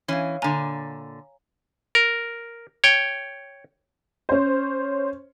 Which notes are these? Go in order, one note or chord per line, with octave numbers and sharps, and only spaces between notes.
E3 C#4 C#5 F5
A#2 D3 G#5 A#5
A#4
C#5 G5
C#4 C5